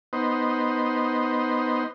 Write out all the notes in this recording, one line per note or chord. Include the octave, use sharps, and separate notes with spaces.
B3 D#4 C5